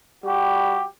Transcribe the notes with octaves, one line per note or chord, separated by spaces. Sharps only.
G3 F#4 G4